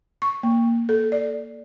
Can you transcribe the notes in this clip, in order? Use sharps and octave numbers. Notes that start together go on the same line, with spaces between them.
C#6
A#3
A4
D5